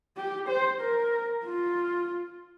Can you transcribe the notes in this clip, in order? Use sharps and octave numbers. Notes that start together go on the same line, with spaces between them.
G4
C5
A#4
F4